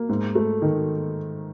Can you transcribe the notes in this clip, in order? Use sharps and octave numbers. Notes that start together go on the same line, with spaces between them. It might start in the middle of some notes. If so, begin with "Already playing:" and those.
Already playing: A#3
G#2
A3
D#3